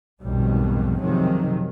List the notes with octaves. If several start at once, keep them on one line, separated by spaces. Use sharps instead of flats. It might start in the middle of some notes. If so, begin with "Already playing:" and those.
B1 F2 G#2 B2 D#3 G3
F#2 C3 D#3 F3 F#3 G#3